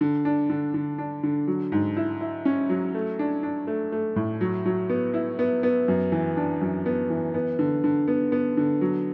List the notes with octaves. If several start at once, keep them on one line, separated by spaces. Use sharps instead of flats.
D3
D4
D3
D3
D4
D3
F#3
G#2
E4
E4
C#4
F#3
A3
D4
D4
A3
A3
A2
F#3
F#3
B3
E4
B3
B3
F#2
E3
D4
F#2
B3
E3
B3
D3
D3
B3
B3
D3
F#3